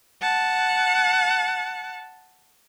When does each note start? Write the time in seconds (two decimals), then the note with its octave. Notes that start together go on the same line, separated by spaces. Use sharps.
0.22 F#5 A5